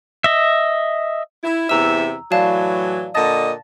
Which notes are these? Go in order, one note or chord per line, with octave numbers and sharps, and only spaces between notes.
D#5 E5
E4
E2 C3 E5 A#5 E6
A2 E3 F#3 D5 F5 A5
A#2 D3 D#5 A5 A6 A#6